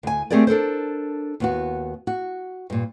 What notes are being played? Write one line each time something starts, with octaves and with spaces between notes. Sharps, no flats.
D2 G#5
A3 C4 G4 G#4 A#4 D5
D4 A4 A#4 C5
D#2 B3 F#4
F#4
G2 A#2